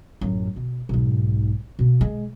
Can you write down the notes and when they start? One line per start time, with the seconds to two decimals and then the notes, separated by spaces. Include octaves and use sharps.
0.21 A1 F#2
0.56 B2
0.89 B1 G#2
1.79 B2 A#3
2.01 G#3